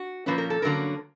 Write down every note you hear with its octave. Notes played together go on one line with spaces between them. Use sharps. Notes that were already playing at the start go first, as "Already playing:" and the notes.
Already playing: F#4
A#2 F3 A#3 C#4 B4
A#4
A4
G2 D3 F#3 A#3 C#4 A#4